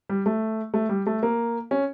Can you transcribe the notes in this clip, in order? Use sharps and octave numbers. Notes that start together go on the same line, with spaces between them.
G3
A3
A3
G3
A3
A#3
C#4